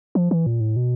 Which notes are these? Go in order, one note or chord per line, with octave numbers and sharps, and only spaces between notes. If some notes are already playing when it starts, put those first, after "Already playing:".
F3
E3
A#2
A2
B2